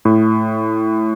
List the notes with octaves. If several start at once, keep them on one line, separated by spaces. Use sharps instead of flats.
A2